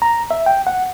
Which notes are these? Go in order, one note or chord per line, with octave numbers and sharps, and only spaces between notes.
A#5
E5
G5
F#5